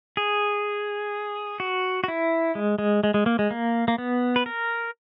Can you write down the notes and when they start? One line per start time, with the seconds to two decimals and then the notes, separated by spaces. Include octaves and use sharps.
0.17 G#4
1.60 F#4
2.04 F#4
2.08 E4
2.55 G#3
2.79 G#3
3.04 G#3
3.14 G#3
3.26 A#3
3.39 G#3
3.51 A#3
3.88 A#3
3.98 B3
4.36 B4
4.46 A#4